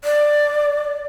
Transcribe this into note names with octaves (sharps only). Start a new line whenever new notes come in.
D5